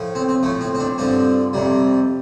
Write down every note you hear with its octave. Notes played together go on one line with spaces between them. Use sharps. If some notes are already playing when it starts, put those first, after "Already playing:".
Already playing: A2 F3
C4
C4
A2 F3 A3
C4
C4
D4
G2 D3 F3 C4
F2 C3 G3